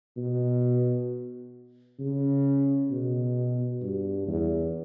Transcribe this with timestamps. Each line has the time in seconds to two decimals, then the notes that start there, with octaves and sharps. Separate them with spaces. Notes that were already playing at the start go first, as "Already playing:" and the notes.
0.17 B2
1.99 C#3
2.91 B2
3.82 G2
4.27 E2